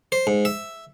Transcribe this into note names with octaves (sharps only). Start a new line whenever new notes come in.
C5
G#2
E5